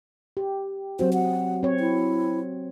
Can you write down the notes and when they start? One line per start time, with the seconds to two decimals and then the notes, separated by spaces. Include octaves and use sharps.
0.37 G4
0.99 F#3 C4 F#4 C5
1.13 F#5
1.63 C4 C#5
1.80 E4